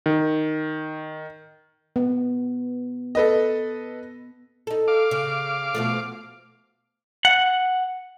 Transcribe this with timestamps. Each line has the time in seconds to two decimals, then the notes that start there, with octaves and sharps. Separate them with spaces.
0.06 D#3
1.96 B3
3.15 A4 B4 D#5
4.67 D#4 A4
4.88 F5 D6
5.11 C#3
5.75 B2 F3 A3
7.25 F#5